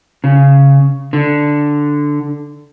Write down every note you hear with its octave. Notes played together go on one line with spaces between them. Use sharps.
C#3
D3